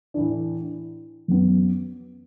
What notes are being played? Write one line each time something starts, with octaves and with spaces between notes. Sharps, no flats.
A2 E3 D4
F#2 F#3 B3